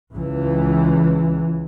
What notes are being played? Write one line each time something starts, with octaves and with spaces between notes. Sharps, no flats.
C#2 E3